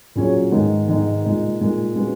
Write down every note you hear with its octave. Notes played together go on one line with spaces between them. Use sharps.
A#2 F#3 C#4 G#4 C#5
G#2 D#3 G#3 B3 D#4
G#2 D#3 G#3 B3 D#4
A#2 G#3 D#4 A#4
A#2 G#3 D#4 A#4
G#3 C#4 F#4 B4